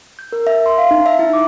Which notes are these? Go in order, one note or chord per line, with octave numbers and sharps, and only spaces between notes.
G6
A#4
E5
C6
F5
D#4
E5
E4
D6